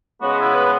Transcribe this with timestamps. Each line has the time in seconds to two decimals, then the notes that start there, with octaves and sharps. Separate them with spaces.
0.21 C#3 G#3 B3 F#4
0.39 E4
0.54 B4